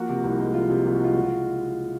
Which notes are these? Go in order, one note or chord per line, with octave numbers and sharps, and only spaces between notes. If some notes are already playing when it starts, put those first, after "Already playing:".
Already playing: F3 A#3 F#4
C3
C2
G#3
F3 F4
C3
C2 F4
F#4
G#3 F4
C#3 F#4
F4